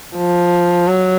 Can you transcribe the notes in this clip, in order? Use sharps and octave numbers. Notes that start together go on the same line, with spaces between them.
F3
F#3